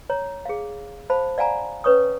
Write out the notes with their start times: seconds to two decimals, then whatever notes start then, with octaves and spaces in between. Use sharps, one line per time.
0.10 C#5 A#5
0.45 G#4 F5
1.10 C5 F5 A5 B5
1.38 D5 F5 F#5 G#5 A#5
1.84 C#4 B4 C#5 C#6 D#6